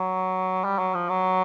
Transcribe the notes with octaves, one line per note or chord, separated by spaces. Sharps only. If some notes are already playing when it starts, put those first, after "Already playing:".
Already playing: F#3
G3
F#3
F3
F#3